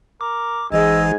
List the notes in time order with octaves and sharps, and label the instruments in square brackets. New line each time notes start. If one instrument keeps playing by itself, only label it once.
[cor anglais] A#4 [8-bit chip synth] D6
[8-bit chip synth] A1 E3 G#4 [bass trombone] G#2 [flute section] D#5 E6 [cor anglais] G#5